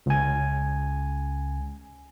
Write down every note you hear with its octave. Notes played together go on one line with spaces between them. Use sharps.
C#2 G#5